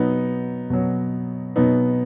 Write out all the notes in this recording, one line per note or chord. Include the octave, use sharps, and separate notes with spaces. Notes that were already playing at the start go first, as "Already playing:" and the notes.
Already playing: B2 F#3 B3 D#4
B2 F#3
B2 F#3 B3 D#4